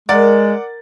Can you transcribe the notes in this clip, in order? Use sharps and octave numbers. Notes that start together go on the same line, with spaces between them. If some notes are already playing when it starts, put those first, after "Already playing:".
G#3 A#4 D5 F#5 A6